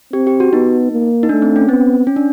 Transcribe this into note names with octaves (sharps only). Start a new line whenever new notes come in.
C4 G4
G4
F#4
B3 D#4
A#3
D#4
A3 D4
C4
C#4
B3 C4
C#4
D4